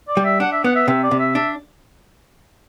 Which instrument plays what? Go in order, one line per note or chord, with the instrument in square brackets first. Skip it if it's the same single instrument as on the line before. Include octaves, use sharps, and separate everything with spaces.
[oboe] D5
[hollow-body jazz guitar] G3
[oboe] E5
[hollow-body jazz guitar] D4 [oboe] F#5
[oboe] E5
[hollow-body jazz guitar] B3 [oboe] F#5
[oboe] E5
[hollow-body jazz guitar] C3 [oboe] E5
[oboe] D5
[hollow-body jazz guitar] C3
[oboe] E5
[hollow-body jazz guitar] D4 [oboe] E5